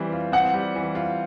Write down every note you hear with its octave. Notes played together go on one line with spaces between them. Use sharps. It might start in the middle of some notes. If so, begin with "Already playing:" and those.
Already playing: E3 G3 C4
F4
C4 F#5
G3
E3
F4